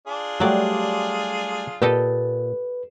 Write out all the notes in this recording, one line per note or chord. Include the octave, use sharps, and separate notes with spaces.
D4 F4 G#4
F#3 G3 A3 G4 D5
A#2 G4 A4 B4 D#5